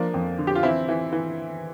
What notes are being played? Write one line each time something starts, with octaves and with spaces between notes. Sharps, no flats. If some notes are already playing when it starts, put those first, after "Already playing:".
Already playing: F3 A#3 D4
F2
D3
G4
F4
E3 C4 E4
E3
E3